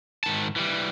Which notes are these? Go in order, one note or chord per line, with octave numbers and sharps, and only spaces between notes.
G#2 D#3 A5
E3 G3